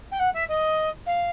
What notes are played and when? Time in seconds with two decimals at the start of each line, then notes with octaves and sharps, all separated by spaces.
0.11 G5
0.19 F#5
0.33 E5
0.48 D#5
1.06 F5